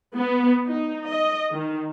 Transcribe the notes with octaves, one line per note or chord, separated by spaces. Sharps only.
B3
D#4
D#5
D#3